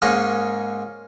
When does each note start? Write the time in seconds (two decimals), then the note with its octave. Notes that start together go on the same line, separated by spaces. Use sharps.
0.02 G#2 G#3 A#3 C#4 D#4 D#5